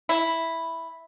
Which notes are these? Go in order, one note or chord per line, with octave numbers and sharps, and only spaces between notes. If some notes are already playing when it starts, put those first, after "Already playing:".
E4